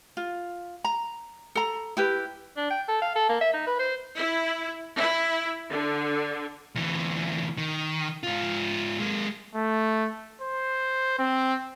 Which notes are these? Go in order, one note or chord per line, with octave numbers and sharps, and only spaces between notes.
F4
A#5
A4 A#5
E4 G4 B4
D4
G5
A4
F5
A4
A#3
E5
D#4
B4
C5
E4
E4
D3
D2 E3
D#3
G#2 F4
G#3 A#3
A3
C5
C4